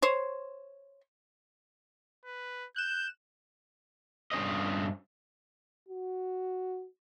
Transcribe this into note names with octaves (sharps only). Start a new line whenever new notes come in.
C5 C#5
B4
F#6 G6 E7
G2 C#4 C5 D#5
F#4